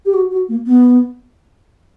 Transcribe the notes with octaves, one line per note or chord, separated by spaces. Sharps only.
G4
F#4
F#4
A#3
B3